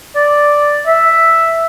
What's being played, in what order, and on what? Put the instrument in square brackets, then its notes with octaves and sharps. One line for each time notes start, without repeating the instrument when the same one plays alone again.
[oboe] D5
E5